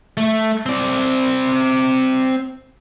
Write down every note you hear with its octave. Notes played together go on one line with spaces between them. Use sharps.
A3
C4 D5